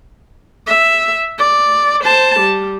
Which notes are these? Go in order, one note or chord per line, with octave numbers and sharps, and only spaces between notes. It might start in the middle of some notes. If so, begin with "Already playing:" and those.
E5
D5
C5 A5
G3